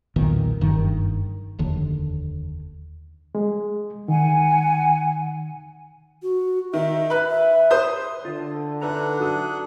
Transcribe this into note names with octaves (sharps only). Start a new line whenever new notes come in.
B1 E2 A#2 D#3
F#1 G2 D#3
F1 D#2 D3
G#3
D#3 F#5 G#5
F#4
D#3 E5
B4 F#6
E5
C5 D#6 G6
D3 F4
D4 D#4 A4 B4 E5 F#5 A#5
F#3 A4 D#6